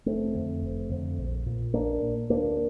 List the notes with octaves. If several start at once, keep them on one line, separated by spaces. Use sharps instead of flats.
F1 A3 C4
F2 D3
F1
F2 D3
A#1
A#2
A#1 A#3 D4
A#2
D2 A#3 D4